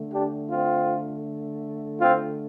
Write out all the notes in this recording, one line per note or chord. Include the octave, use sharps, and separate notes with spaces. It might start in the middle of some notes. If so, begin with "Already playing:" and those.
Already playing: D3 A3
D4 G4
C4 F4
C4 F4